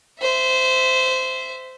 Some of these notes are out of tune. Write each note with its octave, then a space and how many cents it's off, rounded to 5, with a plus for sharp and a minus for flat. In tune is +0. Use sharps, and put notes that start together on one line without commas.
C5 -20 E5 +5